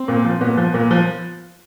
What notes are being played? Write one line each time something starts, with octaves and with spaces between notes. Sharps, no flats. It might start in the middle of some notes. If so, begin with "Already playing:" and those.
Already playing: C4
A#2
F3
A#2 B3
F3
A#2
F3